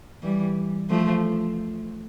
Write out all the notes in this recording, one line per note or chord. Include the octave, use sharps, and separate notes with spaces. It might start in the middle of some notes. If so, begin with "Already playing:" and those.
E3 G3
F3 A3